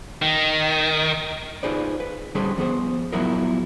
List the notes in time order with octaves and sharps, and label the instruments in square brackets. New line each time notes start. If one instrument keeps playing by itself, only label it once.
[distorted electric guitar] D#3
[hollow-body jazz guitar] D#4 F4 G#4 B4 C5 D5
B4
D3 G3 C#4 G#4 B4 C5
F3 B3 G#4 C5
F3 F#3 B3 E4 G#4 A#4